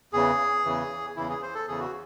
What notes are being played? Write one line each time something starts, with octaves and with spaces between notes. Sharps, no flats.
E2 C#3 E3 G#4
E2 C#3 E3
E2 C#3 E3 E4
G#4
C5
A4
E2 C#3 E3 G#4
F#4